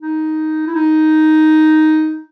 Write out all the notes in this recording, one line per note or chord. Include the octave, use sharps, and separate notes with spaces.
D#4
E4
D#4